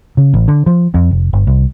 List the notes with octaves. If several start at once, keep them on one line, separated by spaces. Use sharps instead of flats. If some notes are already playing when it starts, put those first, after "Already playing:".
C#3
A1
D3
F3
F2
F1
G1
C2